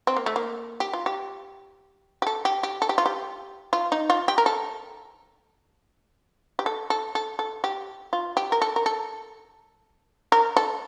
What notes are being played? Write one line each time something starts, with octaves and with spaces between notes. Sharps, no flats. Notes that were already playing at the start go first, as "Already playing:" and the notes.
C4
A#3
A3
A#3
G4
F4
G4
G4
A4
G4
G4
A4
G4
F4
G4
F4
D#4
F4
G4
A#4
A4
G4
A4
A4
A4
A4
G4
F4
G4
A#4
A4
A#4
A4
A#4
A4